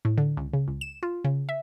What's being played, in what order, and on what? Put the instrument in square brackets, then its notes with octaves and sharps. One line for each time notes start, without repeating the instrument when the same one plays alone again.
[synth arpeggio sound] A2
D3
C#2
C#3
C#2
E7
F4
C#3
E5